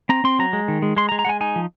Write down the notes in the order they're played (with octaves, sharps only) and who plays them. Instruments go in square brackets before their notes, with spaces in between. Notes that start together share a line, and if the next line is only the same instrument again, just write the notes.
[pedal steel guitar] C4 A#5
C4 C6
F#3 A#5
G#3
D#3
G#3
G#3 C6
A#5
G#3
A#5
G#3 F#5 G#5
D#4 G#5
F3